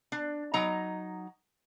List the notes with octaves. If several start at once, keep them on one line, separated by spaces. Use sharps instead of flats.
D4
F#3 D#4 A#5